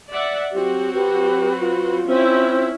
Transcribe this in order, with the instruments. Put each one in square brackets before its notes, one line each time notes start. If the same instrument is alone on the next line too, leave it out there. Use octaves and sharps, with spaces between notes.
[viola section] D5 E5 F#5
[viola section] F#3 C4 F#4 [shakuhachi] G4
[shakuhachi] G4 [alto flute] B4
[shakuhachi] F4
[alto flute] C4 [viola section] C#4 E4 E5